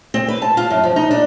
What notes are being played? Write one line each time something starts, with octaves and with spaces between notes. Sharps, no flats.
C4
B4
A5
F4
F#2
F3
D#4
D4